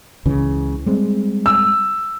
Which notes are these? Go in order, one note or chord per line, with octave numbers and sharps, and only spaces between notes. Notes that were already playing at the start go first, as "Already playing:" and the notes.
C#2 C#3 E3
G3 G#3 C4
E6